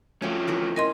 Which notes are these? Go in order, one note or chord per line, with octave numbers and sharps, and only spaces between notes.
F3 A3 C4 C#4 F#4
E3 F#4 A#4
C#4 A#4 D#5 C6